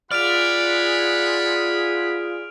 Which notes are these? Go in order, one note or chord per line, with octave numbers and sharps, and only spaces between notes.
F4 G#4 D5 F#5 B5 F6 D7 F7